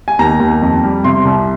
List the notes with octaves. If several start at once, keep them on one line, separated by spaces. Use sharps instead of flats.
G#5
D#2 A#5
D#2
F2
G3
C3 C6
C2